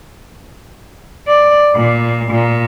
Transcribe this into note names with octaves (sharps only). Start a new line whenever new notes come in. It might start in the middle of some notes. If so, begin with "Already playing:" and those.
D5
A#2
A#2